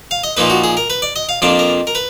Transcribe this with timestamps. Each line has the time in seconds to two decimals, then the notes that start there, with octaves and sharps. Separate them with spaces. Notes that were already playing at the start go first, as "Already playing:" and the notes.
0.11 F5
0.24 D#5
0.37 A#2 F3 A#3 D#4 B4
0.50 F#4
0.64 G#4
0.77 A#4
0.90 B4
1.02 D5
1.16 D#5
1.29 F5
1.42 F2 F3 A#3 D4 D5
1.59 A#4
1.87 A#4
1.95 B4